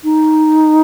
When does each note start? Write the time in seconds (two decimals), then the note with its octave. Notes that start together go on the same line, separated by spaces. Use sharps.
0.04 D#4